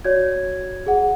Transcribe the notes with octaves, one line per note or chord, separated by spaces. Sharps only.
F#4 C#5 D5 G#6
G#4 F#5